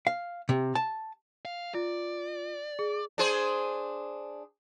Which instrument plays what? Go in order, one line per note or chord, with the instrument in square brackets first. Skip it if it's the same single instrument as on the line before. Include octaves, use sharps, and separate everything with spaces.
[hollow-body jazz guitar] F5
C3
A5
[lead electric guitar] F5
[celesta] F4 [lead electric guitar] D5
[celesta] G#4
[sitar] D4 G#4 C5